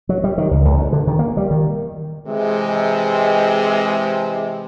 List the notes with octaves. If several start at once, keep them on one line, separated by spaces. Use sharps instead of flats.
F#3
G3
D#3
C#2
C#2
D2
D3
D#3
A#3
G3
D#3
C3 E3 G#3